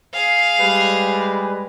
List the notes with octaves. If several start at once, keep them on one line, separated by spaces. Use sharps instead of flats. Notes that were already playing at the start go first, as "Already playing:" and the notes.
G#4 F5
G3 G#3 B4